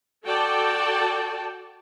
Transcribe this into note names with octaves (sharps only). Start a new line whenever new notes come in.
F#4 A4 D5 G5 A5